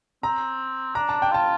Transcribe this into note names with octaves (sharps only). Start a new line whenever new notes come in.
C4 A#5
D4 A#5
A5
G5
F4 A5